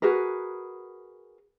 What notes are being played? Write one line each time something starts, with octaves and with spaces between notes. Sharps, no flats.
F#4 G#4 A#4 B4